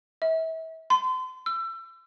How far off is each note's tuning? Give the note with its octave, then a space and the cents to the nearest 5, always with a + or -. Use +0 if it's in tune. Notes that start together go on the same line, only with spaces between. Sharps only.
E5 -35
C6 -35
E6 +30